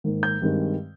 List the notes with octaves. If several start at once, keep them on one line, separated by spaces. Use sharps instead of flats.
G#2 D#3 A#3
G6
G2 D#3 G#3 C4